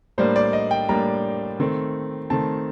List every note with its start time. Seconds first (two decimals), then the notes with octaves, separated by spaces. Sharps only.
0.18 A2 G3 A#3 D4 C5
0.36 D5
0.53 D#5
0.71 G5
0.88 A2 G3 A#3 D4 A#5
1.59 D#3 A3 C4
2.30 D#3 A3 C4 A5